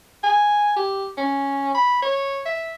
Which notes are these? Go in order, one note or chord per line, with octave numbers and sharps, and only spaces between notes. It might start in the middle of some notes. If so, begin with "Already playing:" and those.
G#5
G4
C#4
B5
C#5
E5